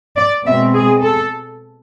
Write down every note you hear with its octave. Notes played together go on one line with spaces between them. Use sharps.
D5
B2 G#3 C4 E5
G#4
A4